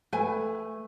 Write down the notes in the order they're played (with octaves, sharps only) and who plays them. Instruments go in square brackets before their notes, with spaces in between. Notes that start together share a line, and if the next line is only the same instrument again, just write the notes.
[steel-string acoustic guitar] A3 [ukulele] B4 G#5